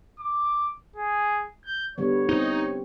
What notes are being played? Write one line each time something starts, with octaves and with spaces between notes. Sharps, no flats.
D6
G#4
G6
D3 G3 B3 C#5
C4 D#4